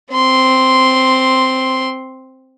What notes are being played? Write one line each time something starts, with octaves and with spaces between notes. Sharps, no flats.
C4 C6